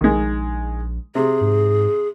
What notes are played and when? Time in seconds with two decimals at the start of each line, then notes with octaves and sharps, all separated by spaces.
0.01 A#1 D#3 G#3
1.15 C3 G#4
1.41 G#2